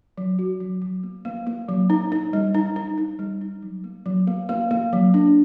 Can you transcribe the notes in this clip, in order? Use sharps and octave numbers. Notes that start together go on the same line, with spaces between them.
F#3
F#4
F#3
F#3
A#3
A#3
A#3
F#3
D#4
D#4
G3
D#4
D#4
D#4
G3
D#4
F#3
A#3
F#3
A#3
A#3
A#3
F#3
D4